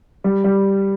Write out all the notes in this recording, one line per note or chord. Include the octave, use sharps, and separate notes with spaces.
G3
G3